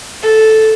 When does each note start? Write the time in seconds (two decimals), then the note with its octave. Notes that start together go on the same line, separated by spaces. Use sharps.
0.22 A4